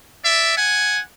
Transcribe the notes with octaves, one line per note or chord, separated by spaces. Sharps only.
D5 E5
F#5 G#5